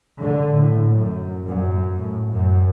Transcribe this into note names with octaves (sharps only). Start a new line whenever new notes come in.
D3
A2
F#2
F#2
A2
F#2